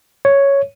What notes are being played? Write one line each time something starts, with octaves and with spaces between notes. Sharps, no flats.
C#5